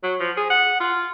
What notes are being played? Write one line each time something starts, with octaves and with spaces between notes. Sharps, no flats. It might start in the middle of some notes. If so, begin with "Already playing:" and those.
F#3
F3
G#4
F#5
F4